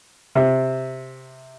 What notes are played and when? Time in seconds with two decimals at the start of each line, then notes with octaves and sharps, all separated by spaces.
0.35 C3